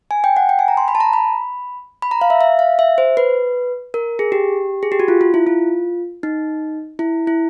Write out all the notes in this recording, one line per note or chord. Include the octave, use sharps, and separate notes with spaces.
G#5
G5
F#5
G5
G#5
A#5
C6
B5
A5
A#5
B5
B5
A#5
F5
E5
E5
F5
E5
C5
B4
A#4
G#4
G4
G#4
G4
F#4
F4
F4
E4
F4
D#4
E4
E4